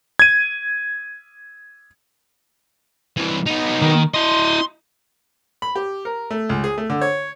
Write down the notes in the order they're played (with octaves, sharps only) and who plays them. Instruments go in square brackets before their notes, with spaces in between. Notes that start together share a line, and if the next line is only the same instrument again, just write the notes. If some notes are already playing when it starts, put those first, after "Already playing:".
[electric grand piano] G#6 D#7
[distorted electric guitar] C2 E3
B3 D#4
[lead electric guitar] D#3
[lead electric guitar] E4 D#5 [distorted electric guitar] C6
[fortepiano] B5
G4
A#4
A3
C#2
G#4
A3
D3
C#5